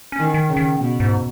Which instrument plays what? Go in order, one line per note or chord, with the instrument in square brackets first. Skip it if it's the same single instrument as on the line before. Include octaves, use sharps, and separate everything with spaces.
[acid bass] C#4
[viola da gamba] D#3
[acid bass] D#3
[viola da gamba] C#3
[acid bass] D#3
[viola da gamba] B2
[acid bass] G#2